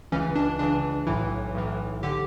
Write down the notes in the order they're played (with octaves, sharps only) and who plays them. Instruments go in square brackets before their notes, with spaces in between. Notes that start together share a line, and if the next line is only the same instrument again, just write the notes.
[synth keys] C#2 C#3 E3 C#4
D4
C#2 C#3 E3 D4
B1 A2 E3 E4
B1 A2 E3
D3 G4